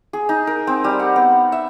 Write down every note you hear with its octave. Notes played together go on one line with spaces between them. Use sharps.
G#4
D#4
A#4
C4
G3
F#5
B3
E5